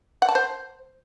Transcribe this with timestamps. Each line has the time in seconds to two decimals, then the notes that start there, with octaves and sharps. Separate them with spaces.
0.22 F#5
0.29 A5
0.35 C5